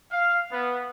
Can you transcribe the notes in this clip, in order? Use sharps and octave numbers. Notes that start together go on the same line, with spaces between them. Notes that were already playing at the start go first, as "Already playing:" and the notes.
F5
B3